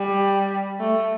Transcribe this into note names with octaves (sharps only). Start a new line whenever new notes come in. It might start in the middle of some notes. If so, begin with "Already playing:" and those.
Already playing: G3
A3